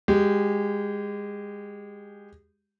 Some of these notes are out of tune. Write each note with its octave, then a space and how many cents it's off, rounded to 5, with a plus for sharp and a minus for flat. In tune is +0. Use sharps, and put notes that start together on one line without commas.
G#3 -25 G4 -15